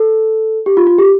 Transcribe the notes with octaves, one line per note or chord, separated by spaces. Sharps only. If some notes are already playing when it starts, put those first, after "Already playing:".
Already playing: A4
G4
F4
F4
G4